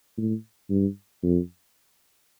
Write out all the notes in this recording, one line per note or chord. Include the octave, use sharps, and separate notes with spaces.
A2
G2
F2